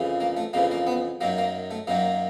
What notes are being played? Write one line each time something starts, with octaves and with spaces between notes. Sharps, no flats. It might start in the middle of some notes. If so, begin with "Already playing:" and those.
Already playing: F2 C#3 E3
A#3
A3
F2 C#3 E3 A#3
A#3
B3
F#2 D#3 F#3 A#3
A#3
A3
F#2 D#3 F#3 A#3